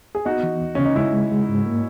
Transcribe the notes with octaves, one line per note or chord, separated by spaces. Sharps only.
G#4
B3 D#4 F#4
E3
D#2
C#3 C#4
D#4
G#3 C#4 E4
G#3
G#3
G#2
A#3